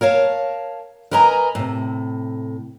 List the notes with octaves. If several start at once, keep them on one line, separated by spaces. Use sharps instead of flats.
A#4 C#5 F5 A5
A#4 B4 D#5 G#5 A#5
A2 C3